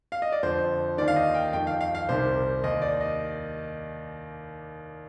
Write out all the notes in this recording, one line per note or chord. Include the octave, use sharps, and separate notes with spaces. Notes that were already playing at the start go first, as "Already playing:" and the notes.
F5
D#5
D5
F2 D3 C5
D#2 D#3 D5
F5
D#5
G5
F2 D#3 G5
F5
F5
F5
C2 C3 D#3 C5
D#2 D#3 D#5
D5
D#5